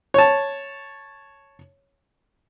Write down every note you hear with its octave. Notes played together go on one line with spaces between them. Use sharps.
C#5 A5